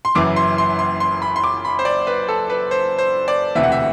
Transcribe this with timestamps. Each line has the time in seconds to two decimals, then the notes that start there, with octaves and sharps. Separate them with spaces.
0.05 C6
0.15 F#1 F#2 E3 D6
0.36 C6
0.58 C6
0.79 C6
1.00 C6
1.22 B5
1.36 C6
1.44 D6
1.65 B5
1.79 C5
1.85 D5
2.07 B4
2.28 A4
2.50 B4
2.71 C5
2.98 C5
3.28 D5
3.55 E1 D2 C3 E3 E5
3.63 F#5
3.72 E5